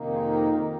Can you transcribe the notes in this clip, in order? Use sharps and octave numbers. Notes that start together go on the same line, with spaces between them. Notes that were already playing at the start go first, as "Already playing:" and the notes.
Already playing: F2 C3 D#3 A#3 D#4
F4 G#4
G4 A#4